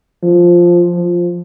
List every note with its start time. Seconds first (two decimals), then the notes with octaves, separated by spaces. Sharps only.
0.23 F3
0.96 F3